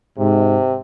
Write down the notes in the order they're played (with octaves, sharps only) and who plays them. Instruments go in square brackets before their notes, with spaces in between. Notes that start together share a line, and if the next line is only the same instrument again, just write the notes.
[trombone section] G#2 [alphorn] C3